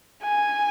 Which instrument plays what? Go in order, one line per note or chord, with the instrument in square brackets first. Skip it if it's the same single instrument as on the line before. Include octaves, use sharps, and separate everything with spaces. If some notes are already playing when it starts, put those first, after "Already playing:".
[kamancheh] G#5